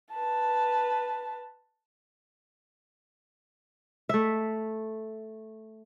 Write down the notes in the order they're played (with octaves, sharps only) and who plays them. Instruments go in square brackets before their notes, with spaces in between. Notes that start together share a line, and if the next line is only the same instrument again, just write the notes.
[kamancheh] B4 A5
[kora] A3 E5